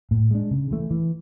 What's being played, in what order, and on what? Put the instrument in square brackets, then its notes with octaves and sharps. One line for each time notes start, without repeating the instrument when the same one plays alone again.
[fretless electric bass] A2
G#3 D4
C#3
E3 A3
E3